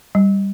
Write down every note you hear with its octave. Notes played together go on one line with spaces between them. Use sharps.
G3